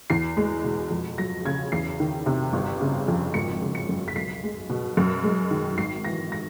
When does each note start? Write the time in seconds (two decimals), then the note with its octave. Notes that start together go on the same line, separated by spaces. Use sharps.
0.10 E2 C7
0.37 G#3
0.64 B2
0.91 F2
1.18 F#3 A#6
1.45 C#3 G#6
1.72 E2 C7
2.00 D#3
2.26 C3
2.53 G1
2.81 C#3
3.08 F2
3.34 G#1 C#7
3.62 C#3
3.75 C#7
3.89 F#2
4.08 B6
4.16 B1 C7
4.43 G#3
4.70 B2
4.97 F#2
5.23 G#3
5.51 D#3
5.78 G#1 C7
6.05 E3 A#6
6.32 A#6